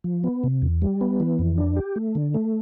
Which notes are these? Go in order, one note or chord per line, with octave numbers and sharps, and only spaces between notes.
F3
B3
C3
E2
G3
B3
E3
F2
D4
G4
A3
D3
A3